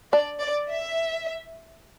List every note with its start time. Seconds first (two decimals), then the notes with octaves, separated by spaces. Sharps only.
0.13 D4 D5
0.41 D5
0.70 E5